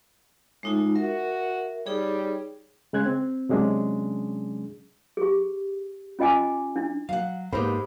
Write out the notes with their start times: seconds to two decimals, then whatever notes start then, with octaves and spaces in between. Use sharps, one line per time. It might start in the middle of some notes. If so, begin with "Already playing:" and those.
0.63 A2 G#3 D#4 F4
0.95 F#4 A#4 E5
1.86 G3 D#4 G#4 C#5
2.93 C#3 G#3 F#6 G#6
3.06 C4
3.49 C3 F#3 G#3 C#4 D4 G#4
5.17 G4 G#4
6.19 C#4 F4 D#5 G5 G#5 D6
6.76 D4 E4
7.09 F#3 F5 F#5
7.52 G#2 A#3 B3 G4 C5 B5